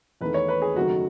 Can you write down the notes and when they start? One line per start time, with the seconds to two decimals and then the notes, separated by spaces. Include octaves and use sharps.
0.21 E2 D#3 A3 B4
0.34 C#5
0.48 B4
0.62 G#4
0.75 F#1 F#2 D#3 F#3 A3 F#4